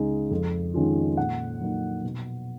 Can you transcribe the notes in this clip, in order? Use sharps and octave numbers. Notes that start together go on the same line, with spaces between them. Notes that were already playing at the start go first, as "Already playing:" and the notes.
Already playing: C#2 C#3 G#3 D#4
F2
D#3 G#3 C#4 F4
A#2 F#5
F#3 A#3 D#4
B2